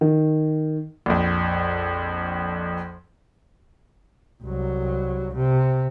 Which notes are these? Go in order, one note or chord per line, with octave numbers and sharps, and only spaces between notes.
D#3
A#1 F2
C2 F#3
C3